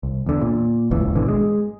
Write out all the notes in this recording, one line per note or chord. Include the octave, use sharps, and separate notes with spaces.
C2
E2 D3
A#2
D#1 G#1 C#2 E3
G#1 B2 D3 E3
G#3